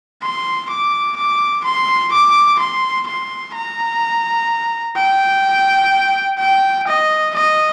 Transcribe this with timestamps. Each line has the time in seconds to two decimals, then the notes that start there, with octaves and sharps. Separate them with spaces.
0.22 C6
0.70 D6
1.17 D6
1.64 C6
2.12 D6
2.59 C6
3.08 C6
3.55 A#5
4.96 G5
6.39 G5
6.87 D#5
7.35 D#5